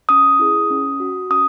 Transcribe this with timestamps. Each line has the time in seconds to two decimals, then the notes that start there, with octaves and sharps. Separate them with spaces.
0.09 C#4 D#6
0.39 E4 G#4
0.70 C#4
1.00 F#4
1.30 C#4 D#6